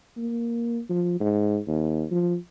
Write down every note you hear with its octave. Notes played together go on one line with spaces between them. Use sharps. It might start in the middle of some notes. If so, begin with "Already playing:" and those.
A#3
F3
G#2
D#2
F3